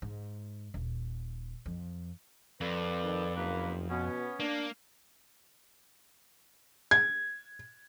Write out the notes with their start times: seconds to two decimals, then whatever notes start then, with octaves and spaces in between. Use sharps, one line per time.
0.02 G#2
0.74 D#1
1.66 F2
2.61 F2 A4 B4 D5
3.03 D#3
3.36 F#1 A#3 B4
3.90 B2 B3 C#4
4.40 A#3 D4
6.91 G#6